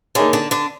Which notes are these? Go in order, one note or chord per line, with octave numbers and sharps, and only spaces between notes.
D3 A#3 D4 D#4 G#4 C#5
D3 D4
D3 D4